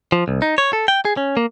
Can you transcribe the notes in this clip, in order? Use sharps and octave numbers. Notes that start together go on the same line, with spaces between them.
F3
C2
D#4
C#5
A4
G5
G#4
C#4
A#3